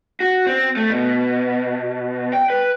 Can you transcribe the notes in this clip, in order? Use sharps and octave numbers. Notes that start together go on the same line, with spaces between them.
F#4
C4
A3
B2
G5
B4